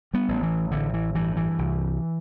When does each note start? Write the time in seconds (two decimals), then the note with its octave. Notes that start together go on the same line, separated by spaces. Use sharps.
0.14 G3 B3
0.28 A1
0.43 E3
0.71 A1 D3
0.94 E3
1.15 G2 E3
1.37 E3
1.59 C2